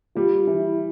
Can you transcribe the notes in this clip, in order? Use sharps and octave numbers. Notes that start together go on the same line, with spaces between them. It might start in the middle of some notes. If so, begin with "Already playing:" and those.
G3 F4
E3 E4